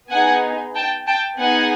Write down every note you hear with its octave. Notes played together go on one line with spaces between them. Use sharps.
B3 D#4 G#4 F#5 G#5
G5 A5
G5 A5
B3 D#4 G#4 F#5 G#5